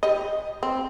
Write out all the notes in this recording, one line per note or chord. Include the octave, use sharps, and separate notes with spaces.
G4 D#5
C4